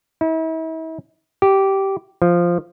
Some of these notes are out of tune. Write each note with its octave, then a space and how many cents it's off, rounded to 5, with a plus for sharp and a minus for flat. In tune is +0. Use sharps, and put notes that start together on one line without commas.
E4 -40
G4 -15
F3 -5